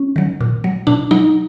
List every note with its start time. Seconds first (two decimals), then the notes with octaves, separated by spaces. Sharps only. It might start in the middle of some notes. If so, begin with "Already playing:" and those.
Already playing: C#4
0.16 D#3 F#3
0.41 A#2
0.64 F#3
0.87 B2 D4
1.11 F#3 D#4